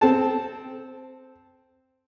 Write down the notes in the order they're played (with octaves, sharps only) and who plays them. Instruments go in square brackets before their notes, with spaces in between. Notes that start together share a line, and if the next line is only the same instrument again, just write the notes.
[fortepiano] C4 A4 A5